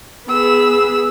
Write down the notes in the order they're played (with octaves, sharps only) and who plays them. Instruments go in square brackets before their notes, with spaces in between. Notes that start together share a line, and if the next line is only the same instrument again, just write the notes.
[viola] B3 G#4 [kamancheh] E6